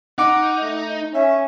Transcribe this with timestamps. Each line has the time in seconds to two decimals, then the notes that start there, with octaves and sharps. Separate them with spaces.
0.18 D#4 F#5 D6
0.62 A3
1.15 C#4 E5